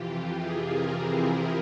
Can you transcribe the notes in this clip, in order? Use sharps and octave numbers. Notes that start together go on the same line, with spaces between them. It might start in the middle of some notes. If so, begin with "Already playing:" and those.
Already playing: F2 C3 E3 F4 G4
G#4
A#4
E4
F4